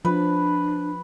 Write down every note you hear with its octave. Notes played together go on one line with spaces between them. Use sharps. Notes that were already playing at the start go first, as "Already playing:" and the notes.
F3 D4 B4